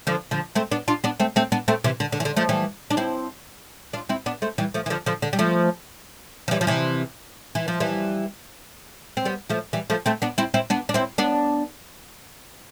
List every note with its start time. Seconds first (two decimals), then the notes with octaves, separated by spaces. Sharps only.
0.07 D3 F3
0.31 D3 F3
0.55 A3 C4
0.71 B3 D4
0.88 D4 F4
1.04 B3 D4
1.20 A3 C4
1.36 A3 C4
1.52 B3 D4
1.68 A3 C4
1.84 C3 E3
2.00 D3
2.12 D3
2.20 E3
2.25 D3
2.37 F3 A3
2.49 E3 G3
2.90 D4
2.97 C4 E4
3.93 D4 F4
4.09 C4 E4
4.26 B3 D4
4.42 A3 C4
4.58 E3 G3
4.74 F3 A3
4.86 E3
4.90 D3 F3
5.06 D3 F3
5.22 D3
5.33 G3
5.39 F3 A3
6.48 F3
6.51 E3 G3
6.61 F3
6.67 C3 E3
7.55 E3
7.68 F3
7.80 E3 G3
9.17 C4
9.25 G3 B3
9.49 F3 A3
9.73 E3 G3
9.90 F3 A3
10.06 A3 C4
10.22 B3 D4
10.38 C4 E4
10.54 C4 E4
10.70 B3 D4
10.89 D4
10.94 C4 E4
11.18 B3 D4